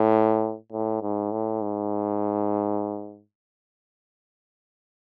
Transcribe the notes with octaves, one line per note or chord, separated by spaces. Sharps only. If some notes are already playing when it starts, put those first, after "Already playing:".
Already playing: A2
A2
G#2
A2
G#2